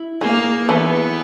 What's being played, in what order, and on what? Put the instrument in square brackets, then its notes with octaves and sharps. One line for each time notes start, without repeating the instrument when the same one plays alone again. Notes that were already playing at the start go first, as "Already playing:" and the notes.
Already playing: [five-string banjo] E4
[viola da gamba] A#3 [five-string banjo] G#4
[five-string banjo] E3 [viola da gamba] B3